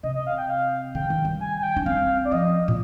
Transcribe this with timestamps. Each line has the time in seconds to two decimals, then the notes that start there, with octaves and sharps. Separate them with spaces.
0.03 C3 D#5
0.15 D#5
0.26 F5
0.38 G5
0.49 F5
0.95 D3 G5
1.10 D#3
1.25 G3
1.41 G#5
1.59 G#5
1.63 G5
1.76 D4
1.86 C4 F5
2.25 D5
2.32 F3 D#5
2.68 A#2